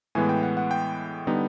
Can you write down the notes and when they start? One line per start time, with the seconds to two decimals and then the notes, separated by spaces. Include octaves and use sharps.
0.15 A2 E3 G#3 B3 G#5
0.29 G5
0.43 F#5
0.57 F#5
0.71 G5
1.27 D3 G3 B3 D#4